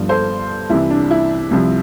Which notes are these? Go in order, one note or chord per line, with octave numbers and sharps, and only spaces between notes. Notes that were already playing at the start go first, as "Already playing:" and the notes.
Already playing: G1 G2 F3
A4 C5
C2 C3 E3 E4
D4
E4
C2 C3 F3